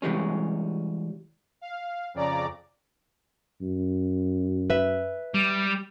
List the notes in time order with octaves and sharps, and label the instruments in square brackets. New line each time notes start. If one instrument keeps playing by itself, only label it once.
[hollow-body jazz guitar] C3 E3 G3 G#3 C#4
[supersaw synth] F5
F2 C#3 D5 A#5 D6
[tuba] F#2
[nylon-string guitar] B4 E5
[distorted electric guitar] G3